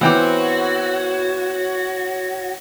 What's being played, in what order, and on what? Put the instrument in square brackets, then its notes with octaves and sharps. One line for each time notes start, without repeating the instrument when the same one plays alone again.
[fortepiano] E3 G5 D6 [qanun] B3 C4 [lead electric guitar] F#4 [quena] C#5